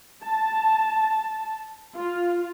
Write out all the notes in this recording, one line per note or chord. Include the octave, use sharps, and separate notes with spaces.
A5
F4